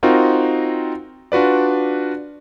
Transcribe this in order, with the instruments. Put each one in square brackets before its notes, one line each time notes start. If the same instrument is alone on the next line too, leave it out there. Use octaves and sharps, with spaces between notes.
[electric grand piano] C4 D#4 F4 F#4 A#4
D4 F4 F#4 B4 D5